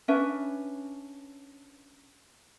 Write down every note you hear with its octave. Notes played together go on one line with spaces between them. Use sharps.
C#4 D4 B4 E5